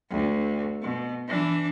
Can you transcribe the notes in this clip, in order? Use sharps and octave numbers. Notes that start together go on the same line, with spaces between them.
D2
B2
E3 D4